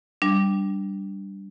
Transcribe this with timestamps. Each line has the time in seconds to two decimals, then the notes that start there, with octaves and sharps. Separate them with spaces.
0.22 G3 D4